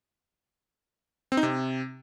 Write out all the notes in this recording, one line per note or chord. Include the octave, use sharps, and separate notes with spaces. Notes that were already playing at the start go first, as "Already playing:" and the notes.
C4
D#4
C3